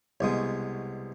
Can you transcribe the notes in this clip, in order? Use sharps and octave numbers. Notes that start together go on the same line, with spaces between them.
C2 B2 G#3